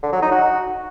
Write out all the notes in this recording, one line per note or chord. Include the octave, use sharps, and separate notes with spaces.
D3
F#3
D#4
F#4